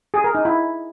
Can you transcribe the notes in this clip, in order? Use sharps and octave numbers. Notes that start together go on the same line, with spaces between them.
G#4
A#4
D#4
E4